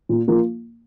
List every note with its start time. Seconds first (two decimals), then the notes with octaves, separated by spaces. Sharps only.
0.09 A#2
0.27 F3 A#3 F4